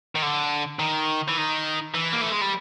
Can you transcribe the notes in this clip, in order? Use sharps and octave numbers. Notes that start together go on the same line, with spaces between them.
D#3
D3
D#3
E3
D#3
E3
A#3
A3
G#3
G3